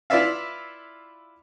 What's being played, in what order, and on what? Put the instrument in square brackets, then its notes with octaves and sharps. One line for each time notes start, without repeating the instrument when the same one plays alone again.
[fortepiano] E4 F4 B4 D5 E5 F5